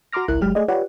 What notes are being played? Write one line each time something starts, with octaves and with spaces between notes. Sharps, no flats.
F#4 A#5 C6 D6 F6 A#6
G#1 C#2 E4 A#4 F#6
G1 F#3 G#3 G4 F6
A3 G#4 D5 D#5
F4 G4 B4 C#5 D5 F#5